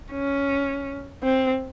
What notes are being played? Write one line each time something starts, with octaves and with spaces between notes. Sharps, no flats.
C#4
C4